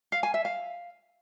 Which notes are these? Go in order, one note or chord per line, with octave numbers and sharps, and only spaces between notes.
F5
G#5
E5
F5